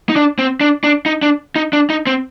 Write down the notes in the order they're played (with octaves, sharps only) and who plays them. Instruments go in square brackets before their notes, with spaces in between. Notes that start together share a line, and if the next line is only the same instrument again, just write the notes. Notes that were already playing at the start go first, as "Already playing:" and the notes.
[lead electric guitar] D#4
D4
C4
D4
D4
D#4
D4
D#4
D4
D#4
C4